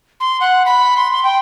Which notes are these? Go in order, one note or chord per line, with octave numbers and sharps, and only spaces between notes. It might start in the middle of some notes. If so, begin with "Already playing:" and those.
C6
F#5
B5
C6
C6
G5